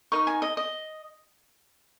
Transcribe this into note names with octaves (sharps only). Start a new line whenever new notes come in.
D#4 A#4 D#5 C#6
G#5
D#5
D#5